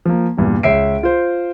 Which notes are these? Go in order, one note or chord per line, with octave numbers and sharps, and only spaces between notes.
F3 A#3
E2 G2 A#2
C#2 C#5 E5 C7 D7
F4 C5